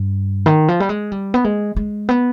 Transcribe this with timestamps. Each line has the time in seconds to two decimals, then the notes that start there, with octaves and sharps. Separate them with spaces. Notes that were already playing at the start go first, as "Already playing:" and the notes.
Already playing: G2
0.46 D#3
0.68 F3
0.80 G3
0.89 G#3
1.12 G3
1.34 B3
1.44 G#3
1.76 G#3
2.09 B3